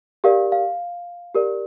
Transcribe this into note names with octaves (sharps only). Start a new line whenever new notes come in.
G4 A#4 D5 F5
F5
G4 A#4 D5